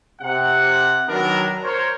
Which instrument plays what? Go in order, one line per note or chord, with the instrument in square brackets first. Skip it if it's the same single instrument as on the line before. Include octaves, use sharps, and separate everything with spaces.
[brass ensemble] C3 F#5
D#3 F#3 B3 D4 A#4
A#4 C5 C#5